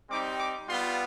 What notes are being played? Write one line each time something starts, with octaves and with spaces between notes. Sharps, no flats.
G3 C4 D#4 G4 D6
D6
G3 B3 F4 C6